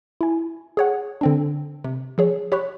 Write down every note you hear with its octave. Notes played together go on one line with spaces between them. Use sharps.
E4 G#5
G#4 C#5 F#5
D3 C4 D4
C3
F3 G#4 C#5
G4 C#5 B5 C#6 F#6